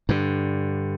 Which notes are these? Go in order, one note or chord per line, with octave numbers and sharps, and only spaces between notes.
G2 D3